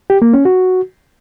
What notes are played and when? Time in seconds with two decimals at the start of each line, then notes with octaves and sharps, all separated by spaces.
0.10 G4
0.22 A#3
0.33 C#4
0.45 F#4